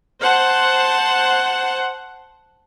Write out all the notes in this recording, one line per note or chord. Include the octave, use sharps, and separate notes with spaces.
C5 F#5 A5